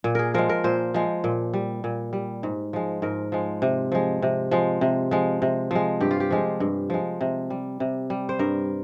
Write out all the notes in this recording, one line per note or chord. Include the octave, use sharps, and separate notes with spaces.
A#2
G#4 A#4
F3 G#3 A#4
A#4
A#2 C5
F3 G#3
A#2
G3
A#2
G3
G#2
F3 G#3
G#2 A#4
F3 G#3
C3
F3 G#3
C3
F3 G#3
C3
F3 G#3
C3
F3 G#3
G2 G4
F4
G4
F3 G#3
G2
F3 G#3
C3
G3
C3
G3
C5
G2 A#4